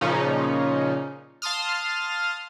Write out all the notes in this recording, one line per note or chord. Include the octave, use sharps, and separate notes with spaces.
A#2 C#3 F3 C#4 D#4
F5 A5 C6 D#6 F6